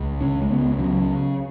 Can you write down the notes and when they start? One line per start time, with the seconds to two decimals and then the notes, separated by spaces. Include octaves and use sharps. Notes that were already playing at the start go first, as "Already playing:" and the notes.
Already playing: C#2
0.21 C#3 C#4
0.42 G#3
0.50 C#2 B3
0.79 C#3 F#3